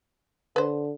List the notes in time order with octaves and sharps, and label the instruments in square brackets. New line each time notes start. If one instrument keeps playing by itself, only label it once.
[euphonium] D3 [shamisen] B4 C5